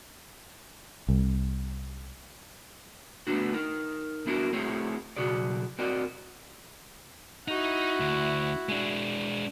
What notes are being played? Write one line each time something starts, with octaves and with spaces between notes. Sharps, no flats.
C2
A3 B3 C4 D4 F#4
D#4 A#4
B3 D4 E4 F#4 A#4
A3 C4 E4 F#4 G#4 C#5
B1 E2 C#3 F#4 G#4 D5
C4 F#4 A#4 D5 D#5
D#4 E4 F#4
D2
G#3 D4